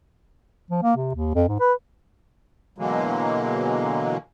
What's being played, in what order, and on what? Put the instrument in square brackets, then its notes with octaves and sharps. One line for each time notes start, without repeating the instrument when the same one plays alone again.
[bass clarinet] F3
A#3
C3
D#2
F2
G#2
B4
[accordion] B2 D3 E3 F#3 G#3 A#3